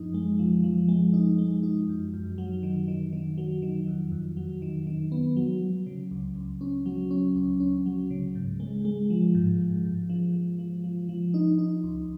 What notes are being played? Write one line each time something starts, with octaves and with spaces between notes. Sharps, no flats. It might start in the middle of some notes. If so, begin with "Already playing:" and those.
Already playing: F#2 F3 D#4
G#3
F3
F3
G#3
D#4
G#3
D#4
F#2
F#2
F#3
D#3
D#3
D#3
F#3
D#3
F2
F2
F#3
D#3
D#3
B3
F#3
F#3
C#3
C#2
C#2
C#4
F#3
C#4
C#2
C#4
F#3
C#3
G#2
G#3
G#3
F3
G#2
G#2
G#2
F3
F3
F3
F3
F3
D#4
D#4
C#2